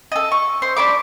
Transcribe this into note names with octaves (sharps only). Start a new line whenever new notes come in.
A4 D#5
C#6
C5
D4 A5 B5 D6